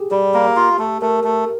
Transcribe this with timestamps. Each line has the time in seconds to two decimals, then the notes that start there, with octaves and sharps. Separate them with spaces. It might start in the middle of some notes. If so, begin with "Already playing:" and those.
Already playing: G4 G#4
0.11 G3 G4
0.34 A#3
0.56 F4
0.79 A3
1.02 A3 A#4
1.24 A3